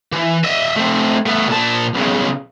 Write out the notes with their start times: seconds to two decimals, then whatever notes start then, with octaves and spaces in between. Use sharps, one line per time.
0.13 E3
0.44 D#5 E5
0.76 A3 C4
1.26 A3 B3
1.48 A#2 A5
1.95 B1 C#3